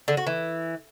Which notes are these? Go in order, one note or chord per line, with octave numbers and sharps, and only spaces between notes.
D3
F#4
E3